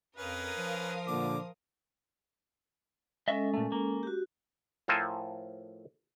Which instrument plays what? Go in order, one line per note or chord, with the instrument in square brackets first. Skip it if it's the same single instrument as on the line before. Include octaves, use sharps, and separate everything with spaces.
[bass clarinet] F2 [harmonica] C#4 B4 [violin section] A#4 F5 D#6
[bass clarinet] F3
[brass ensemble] A#2 D3 [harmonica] D6
[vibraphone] G#3 C#4 A4 [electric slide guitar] D#5 E5
[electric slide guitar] A#2 A3
A#3
[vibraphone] F#4 G4
[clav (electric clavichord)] A2 F3 A4 A#4 C5 G#5